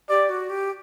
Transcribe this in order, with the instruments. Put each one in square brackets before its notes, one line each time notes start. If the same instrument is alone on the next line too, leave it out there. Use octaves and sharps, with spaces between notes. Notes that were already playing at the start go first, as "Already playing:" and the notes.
[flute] G4 [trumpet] D5
[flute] F#4
G4